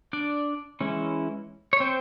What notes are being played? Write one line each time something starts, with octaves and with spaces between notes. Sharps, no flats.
D4 D5
E3 G#3 C#4 E4
C#5
C4 C5